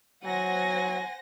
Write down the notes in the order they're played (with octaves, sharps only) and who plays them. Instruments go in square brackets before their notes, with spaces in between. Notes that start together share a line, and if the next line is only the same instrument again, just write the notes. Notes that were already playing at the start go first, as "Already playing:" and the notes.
[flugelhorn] F#3 [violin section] C5 F#5 A#6 [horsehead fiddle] G#5